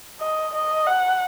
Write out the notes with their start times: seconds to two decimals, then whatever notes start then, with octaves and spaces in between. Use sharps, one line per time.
0.20 D#5
0.54 D#5
0.87 F#5